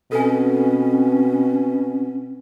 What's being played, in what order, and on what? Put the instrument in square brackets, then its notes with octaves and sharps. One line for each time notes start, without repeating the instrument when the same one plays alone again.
[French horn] B2 [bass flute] C4 [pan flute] C#4 [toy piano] A4 G#5